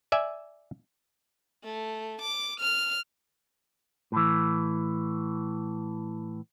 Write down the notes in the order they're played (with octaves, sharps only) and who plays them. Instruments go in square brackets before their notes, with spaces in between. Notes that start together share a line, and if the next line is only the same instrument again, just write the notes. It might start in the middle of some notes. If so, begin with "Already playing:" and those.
[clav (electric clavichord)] D5 E5 G#5
[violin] A3
D6
F6
[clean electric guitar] A2 E3